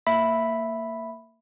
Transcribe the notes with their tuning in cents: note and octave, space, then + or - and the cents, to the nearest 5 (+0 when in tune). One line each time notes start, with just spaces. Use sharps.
A#3 -25 E5 +0 B5 +0